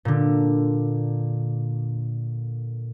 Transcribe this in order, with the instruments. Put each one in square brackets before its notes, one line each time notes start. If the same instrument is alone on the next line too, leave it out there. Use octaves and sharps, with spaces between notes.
[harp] A#2 D3